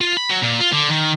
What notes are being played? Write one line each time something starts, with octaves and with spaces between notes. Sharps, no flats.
F4
B5
F#3
A#2
F4
D3
D#3